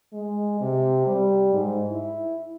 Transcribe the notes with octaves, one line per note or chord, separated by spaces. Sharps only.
G#3
C3
G3
G#2
E4